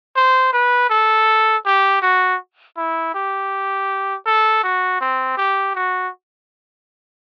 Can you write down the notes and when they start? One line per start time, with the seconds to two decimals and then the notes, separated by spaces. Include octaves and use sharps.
0.16 C5
0.53 B4
0.90 A4
1.66 G4
2.02 F#4
2.77 E4
3.15 G4
4.26 A4
4.64 F#4
5.01 C4
5.37 G4
5.75 F#4